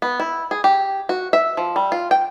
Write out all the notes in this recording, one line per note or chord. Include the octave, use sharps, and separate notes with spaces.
B3
E4
G#4
G4
F#4
E5
F3
G3
F4
G5